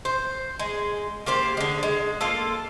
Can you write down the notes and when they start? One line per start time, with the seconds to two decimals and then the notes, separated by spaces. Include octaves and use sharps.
0.05 C5
0.59 G#3
1.26 A#3 G4 C5 D5
1.57 D3 G#3
1.83 G#3
2.21 A#3 F4 A4